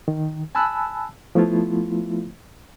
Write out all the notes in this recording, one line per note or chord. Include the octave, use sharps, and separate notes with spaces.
D#3
G#5 A5 B5 E6 F#6
F3 A3 B3 E4 F4